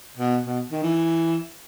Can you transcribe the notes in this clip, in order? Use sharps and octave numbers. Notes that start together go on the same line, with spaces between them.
B2
B2
D#3
E3